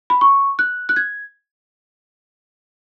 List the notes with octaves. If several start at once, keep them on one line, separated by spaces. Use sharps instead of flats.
B5
C#6
F#6
F#6
G#6